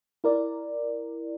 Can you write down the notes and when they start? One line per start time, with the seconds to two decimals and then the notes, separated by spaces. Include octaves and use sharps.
0.24 E4 A#4 D5